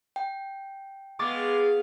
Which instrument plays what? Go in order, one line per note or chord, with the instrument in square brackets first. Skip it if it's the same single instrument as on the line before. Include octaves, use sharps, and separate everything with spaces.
[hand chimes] G5
[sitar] G#3 [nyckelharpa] B3 F5 [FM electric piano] C#6 D6 A6